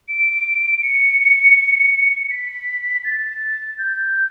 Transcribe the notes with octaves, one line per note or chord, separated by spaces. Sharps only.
D7
C#7
B6
A6
G6